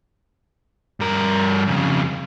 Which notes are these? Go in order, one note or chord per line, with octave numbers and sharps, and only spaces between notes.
G2 A#4
F2 C#3